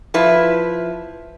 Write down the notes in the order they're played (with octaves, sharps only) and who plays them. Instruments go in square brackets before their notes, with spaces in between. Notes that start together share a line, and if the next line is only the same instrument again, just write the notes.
[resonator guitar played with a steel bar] F3 E4 B4